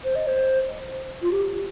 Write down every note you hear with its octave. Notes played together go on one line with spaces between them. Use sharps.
C5
D#5
C5
F4
G4